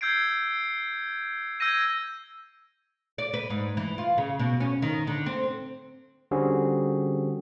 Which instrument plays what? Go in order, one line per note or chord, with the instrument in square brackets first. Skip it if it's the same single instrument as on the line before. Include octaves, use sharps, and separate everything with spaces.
[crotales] E6 G6 G#6 C7 D7
E6 G6 G#6 A#6 D#7
[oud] D5
B4
G#2
E3
F4
C#3
B2
C#4
D#3
D3
C4
[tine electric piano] D3 G3 C4 C#4 F#4 G#4